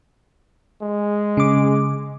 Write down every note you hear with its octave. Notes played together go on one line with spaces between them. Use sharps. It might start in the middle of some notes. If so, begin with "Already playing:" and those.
G#3
C#3 D6